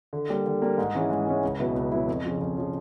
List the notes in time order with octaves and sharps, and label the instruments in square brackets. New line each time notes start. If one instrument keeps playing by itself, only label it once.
[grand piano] D3
G3 A#3
D3
G3 A#3
G#2
E3 G#3 C#4
G#2
E3 G#3 C#4
C#2
B2 F#3 B3 E4
C#2
B2 F#3 B3 E4
F2
C#3 F3
F2
C#3 F3